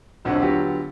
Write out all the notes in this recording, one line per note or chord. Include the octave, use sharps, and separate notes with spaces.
D#1 B1 D3 C4 F#5
D3 F#3 B3 F4 G4